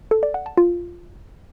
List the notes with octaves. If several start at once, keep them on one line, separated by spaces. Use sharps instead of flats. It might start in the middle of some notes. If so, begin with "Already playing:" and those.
A4
D5
F#5
A5
F4